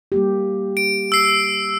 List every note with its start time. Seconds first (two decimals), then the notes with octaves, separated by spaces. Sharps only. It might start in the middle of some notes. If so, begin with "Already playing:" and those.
0.12 G3 A#3 G4
0.77 D7
1.12 E6 C7